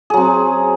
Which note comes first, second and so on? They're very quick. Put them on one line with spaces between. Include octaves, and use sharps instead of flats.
G#4 F#3 C4